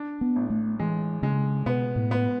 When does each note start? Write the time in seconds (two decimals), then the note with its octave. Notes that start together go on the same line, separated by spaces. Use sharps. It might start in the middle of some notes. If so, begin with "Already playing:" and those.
Already playing: D4
0.21 B3
0.36 A1
0.50 A3
0.80 E3 G#3
1.23 C#3 G#3
1.66 B2 B3
1.96 A2
2.11 B3